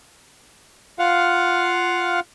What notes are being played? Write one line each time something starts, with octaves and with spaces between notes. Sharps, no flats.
F4 F5 F#5